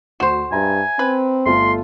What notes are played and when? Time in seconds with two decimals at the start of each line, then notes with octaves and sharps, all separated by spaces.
0.20 D2 F#4 C5 E7
0.52 G2 E5 G#5 A#5 B5
0.99 C4 B4
1.46 G1 A3 F4 C6